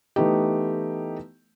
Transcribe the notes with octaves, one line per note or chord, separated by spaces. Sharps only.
E3 A3 B3 D#4 G4